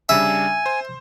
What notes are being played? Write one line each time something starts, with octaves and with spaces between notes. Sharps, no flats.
C#3 G3 D4 E5 G#5
C5